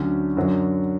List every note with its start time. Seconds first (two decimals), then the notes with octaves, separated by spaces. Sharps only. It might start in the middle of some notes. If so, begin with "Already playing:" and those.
Already playing: D2 D3 F#3 C#4
0.37 F#2 D3 F#3